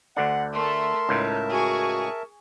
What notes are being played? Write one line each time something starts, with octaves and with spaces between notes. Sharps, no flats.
D2 D3 D4 F#5
A3 A4 A#4 E5 A5 C6
C#2 A2 D#4
F#4 G#4 G#5 C#6